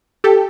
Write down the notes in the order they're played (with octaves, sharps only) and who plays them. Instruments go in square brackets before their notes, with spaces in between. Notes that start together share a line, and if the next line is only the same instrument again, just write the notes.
[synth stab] G4 A4